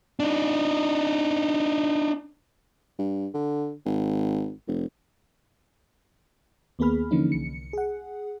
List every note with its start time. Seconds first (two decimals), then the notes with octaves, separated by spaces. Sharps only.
0.20 D4 D#4
2.99 G2
3.34 D3
3.86 G#1
4.67 F1
6.79 D#2 A#3 B3 G#4 B5 F6
7.11 D3 E3 F3 A#3 C#4 D#4
7.32 C2 C#7
7.73 G#4 F#5